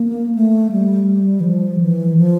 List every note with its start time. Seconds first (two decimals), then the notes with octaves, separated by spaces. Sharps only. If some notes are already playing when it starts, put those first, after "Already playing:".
Already playing: A#3
0.35 A3
0.72 G3
1.40 E3
1.44 F3
1.80 E3
2.17 F3